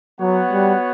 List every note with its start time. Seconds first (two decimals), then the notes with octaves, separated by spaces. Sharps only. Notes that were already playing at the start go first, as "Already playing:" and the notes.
0.20 F#3 B3 F#4 C#5 F#5
0.52 G3